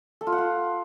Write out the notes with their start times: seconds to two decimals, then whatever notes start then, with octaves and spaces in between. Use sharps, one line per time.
0.21 A4
0.27 F4
0.32 F#5
0.38 F4